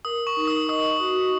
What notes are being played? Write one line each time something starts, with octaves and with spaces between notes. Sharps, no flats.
A#4 D#6
C#6
D#4
D#6
D#5 D#6
F#4